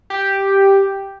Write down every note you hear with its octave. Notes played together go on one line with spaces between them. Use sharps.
G4